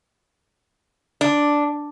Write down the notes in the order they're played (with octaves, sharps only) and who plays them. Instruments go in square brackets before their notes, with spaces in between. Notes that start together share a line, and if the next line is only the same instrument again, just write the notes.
[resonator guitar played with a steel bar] D4